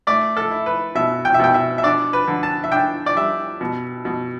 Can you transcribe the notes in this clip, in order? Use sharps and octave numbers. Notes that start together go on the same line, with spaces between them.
A3 D5
A4
E4
B4
B2 E5
G5
E5
B2 G5
E5
E5
D4 D5
B4
D3
A5
E5
D4 G5
D5
G3 E5
B2
B2